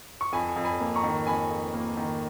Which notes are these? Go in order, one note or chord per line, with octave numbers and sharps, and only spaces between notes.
C#6
F2 G#5 B5
F2
G#5 B5
A#3
A#5 C#6
D#3
F2 G#5 B5
F2
A#3
D#3